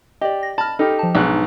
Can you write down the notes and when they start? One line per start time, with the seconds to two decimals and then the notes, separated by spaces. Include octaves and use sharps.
0.21 G4 D5 D#5
0.43 A#6
0.58 A5 B5 F6
0.79 D#4 G4 A4
0.99 F3 A5
1.15 B1 G#2 D4 F#6